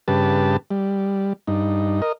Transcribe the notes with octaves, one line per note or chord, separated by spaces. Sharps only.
G2 C#3 G4 B4 A5
G3
G2 D#4
A#4 D#5